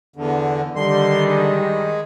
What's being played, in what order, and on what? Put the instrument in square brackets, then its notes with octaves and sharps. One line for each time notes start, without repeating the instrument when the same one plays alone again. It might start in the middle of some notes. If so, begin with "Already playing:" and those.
[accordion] E2 D3
[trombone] D3 [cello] D#3 [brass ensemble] G3 [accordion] C6
[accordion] G#3